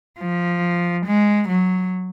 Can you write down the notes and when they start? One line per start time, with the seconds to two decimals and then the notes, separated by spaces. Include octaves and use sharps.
0.19 F3
1.06 G#3
1.48 F#3